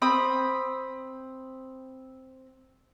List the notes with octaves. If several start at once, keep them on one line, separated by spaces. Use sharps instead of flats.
C4 B5 D#6